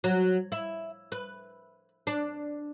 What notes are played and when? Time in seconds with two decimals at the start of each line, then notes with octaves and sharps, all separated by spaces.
0.04 F#3
0.52 E4
1.12 B4
2.07 D4